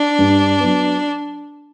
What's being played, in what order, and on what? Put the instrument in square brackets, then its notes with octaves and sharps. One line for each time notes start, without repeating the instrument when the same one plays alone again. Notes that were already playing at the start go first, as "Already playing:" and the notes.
Already playing: [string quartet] D4
[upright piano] G2
F#3 B3